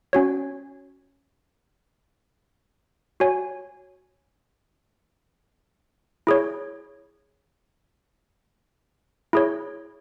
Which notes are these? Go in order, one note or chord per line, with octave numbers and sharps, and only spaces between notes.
C#4 F#4 C#5
F#4 C#5 G#5
E4 G#4 C#5
E4 G#4 C#5